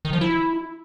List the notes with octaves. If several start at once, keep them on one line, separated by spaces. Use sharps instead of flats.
D#3
F3
E4